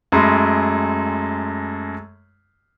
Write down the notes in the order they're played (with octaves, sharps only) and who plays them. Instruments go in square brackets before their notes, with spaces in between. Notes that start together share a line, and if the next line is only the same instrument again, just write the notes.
[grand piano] F#2 G#3 A3 B5 C6